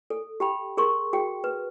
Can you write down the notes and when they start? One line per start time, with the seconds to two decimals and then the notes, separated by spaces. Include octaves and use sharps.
0.10 A4
0.40 G4 G5 B5
0.77 G#4 A#4 C6 C#6
1.13 F#4 G#4 G5
1.44 B4